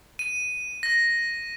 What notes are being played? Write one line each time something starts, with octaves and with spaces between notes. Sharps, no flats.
D#7
A#6